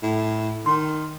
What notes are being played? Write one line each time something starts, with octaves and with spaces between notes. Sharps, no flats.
A2
D#3 C6